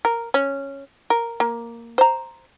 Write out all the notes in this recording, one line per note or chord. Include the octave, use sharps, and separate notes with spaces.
A#4
C#4
A#4
A#3
C5 A#5